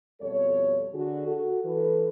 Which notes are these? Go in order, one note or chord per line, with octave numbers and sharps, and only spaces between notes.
F2 B2 G3 A4 C#5
D3 F#4 G#4
F#4 A4
E3 A4 B4